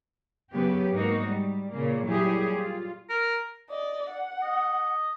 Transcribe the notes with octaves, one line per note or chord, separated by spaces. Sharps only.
C#3 F#3 B3 G4 B4
G#2 A#3 D#4 F#4
G3
A#2 C#3 A#3
A#2 F#3 G3 E4 G4 G#4
F4
A#4
D5 D#5
F#5
D#5